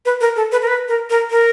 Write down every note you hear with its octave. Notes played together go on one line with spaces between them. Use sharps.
B4
A#4
A4
B4
A#4
B4
A#4
A#4
A#4